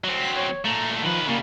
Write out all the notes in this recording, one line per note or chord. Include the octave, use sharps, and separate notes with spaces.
F#3 C4
B6
C#5
A#2 A3 A#5
D#3 F3 B4
C#3 G3 A#3